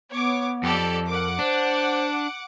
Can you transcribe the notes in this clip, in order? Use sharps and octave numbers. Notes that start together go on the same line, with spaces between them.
B3 C#5 D6
F2 G4 A4 D5
A#4 F#5 D6
D4 C5